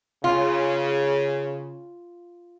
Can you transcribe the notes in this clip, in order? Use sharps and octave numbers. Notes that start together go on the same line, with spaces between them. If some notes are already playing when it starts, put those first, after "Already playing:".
C#3 F4